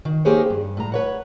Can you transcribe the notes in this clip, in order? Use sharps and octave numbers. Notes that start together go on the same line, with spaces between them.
D#3
A#3 D#4 G4 G#4 C5 C#5
G2
A2 A#5
B4 C#5 F#5